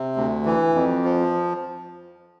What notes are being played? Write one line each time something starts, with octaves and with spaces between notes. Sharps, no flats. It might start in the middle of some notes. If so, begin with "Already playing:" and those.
Already playing: C3
D2
E3
F2
F3